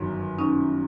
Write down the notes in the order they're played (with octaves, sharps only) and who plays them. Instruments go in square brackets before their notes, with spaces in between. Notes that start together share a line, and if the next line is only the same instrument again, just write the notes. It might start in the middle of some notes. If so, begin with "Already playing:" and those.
Already playing: [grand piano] G1 F#2 D#3 F#3
[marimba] C#4 D#4